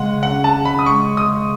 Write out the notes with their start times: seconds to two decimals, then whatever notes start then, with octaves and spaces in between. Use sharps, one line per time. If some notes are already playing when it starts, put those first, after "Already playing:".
Already playing: C#3 G#3 F#5
0.23 C#4 F#5
0.44 A5
0.55 C#3
0.65 B5
0.79 D#6
0.86 G#3 C#6
1.17 C#3 D#6